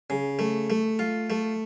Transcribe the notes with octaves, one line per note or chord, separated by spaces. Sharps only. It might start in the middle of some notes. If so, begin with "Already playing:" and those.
C#3
A3
A3
F4
A3